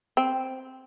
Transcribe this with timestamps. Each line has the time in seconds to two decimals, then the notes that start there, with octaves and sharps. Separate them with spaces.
0.17 C4